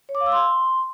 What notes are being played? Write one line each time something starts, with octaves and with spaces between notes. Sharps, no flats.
C#5
D6
F5
E6
C6